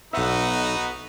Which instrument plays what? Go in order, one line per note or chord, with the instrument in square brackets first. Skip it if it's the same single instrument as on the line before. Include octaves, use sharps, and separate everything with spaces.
[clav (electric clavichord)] B1 E5 [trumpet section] B3 D#4 F#4